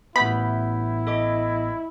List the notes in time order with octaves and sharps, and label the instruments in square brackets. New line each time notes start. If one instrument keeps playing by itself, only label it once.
[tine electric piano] A1 B3 [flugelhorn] E4 [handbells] E5 G6 [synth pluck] B5
[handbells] A4 D#5 D6